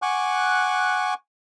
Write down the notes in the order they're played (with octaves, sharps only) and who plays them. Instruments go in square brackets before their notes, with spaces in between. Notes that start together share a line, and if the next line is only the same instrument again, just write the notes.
[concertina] F#5 G#5 C#6 D6 F#6